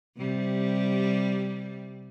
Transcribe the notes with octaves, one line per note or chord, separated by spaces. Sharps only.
C3 G3